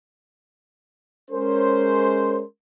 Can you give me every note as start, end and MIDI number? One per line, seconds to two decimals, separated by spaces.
1.31 2.43 56
1.31 2.43 61
1.31 2.43 70
1.31 2.43 72